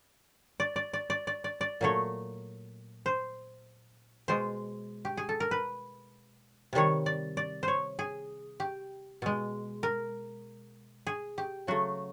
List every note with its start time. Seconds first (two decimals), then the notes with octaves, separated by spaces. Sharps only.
0.60 D5
0.76 D5
0.93 D5
1.10 D5
1.27 D5
1.44 D5
1.61 D5
1.81 A#2 F#3 A3 C#5
3.06 C5
4.28 B2 G#3 C5
5.05 G4
5.17 G#4
5.29 A4
5.40 A#4
5.51 B4
6.73 C3 D#3 G3 C#5
7.06 D5
7.37 D5
7.63 C5 C#5
7.99 G#4
8.60 G4
9.22 B2 G#3
9.83 A#4
11.07 G#4
11.38 G4
11.67 C#3 F#3 A3 F#4